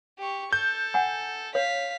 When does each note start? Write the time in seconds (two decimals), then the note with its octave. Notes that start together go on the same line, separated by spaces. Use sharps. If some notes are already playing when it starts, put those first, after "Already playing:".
0.19 G4 C#6
0.53 A4 G6
0.94 F#5 G#5
1.55 C#5 F5 B6